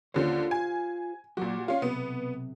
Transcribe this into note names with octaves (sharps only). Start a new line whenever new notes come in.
D#2 D3 C#4 F4 G4 C5
G#5
A#2 F#3 F#4 G4
C#4 F4 F5
B1 C3 B3